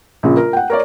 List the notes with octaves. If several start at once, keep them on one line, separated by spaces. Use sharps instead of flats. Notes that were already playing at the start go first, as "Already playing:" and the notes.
A#1 C#3
A#4
F#5 G5
A#4 C#5 D5